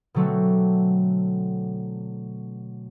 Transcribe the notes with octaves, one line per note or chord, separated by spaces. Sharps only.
B2 D3 F#3 A3 C4